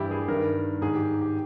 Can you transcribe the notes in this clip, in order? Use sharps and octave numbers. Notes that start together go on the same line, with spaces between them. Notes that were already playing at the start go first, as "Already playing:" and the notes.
Already playing: G2 E3 E4 G4
G#4
G2 D#3 A#4
G#2 D#3 G#4
G4
G4